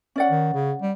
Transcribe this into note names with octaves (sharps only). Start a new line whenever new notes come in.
C#4 D5 F#5
D#3
C#3
G3